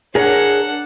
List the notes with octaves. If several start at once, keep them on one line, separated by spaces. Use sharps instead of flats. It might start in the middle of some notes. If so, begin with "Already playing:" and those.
D4 G#4 A#4 C#5 F#5